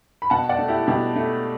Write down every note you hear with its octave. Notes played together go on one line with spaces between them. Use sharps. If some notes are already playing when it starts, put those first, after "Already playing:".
B5
B2 F#5 A5
D5 F#5
A3
E4 G4
B2 E4 G4
A3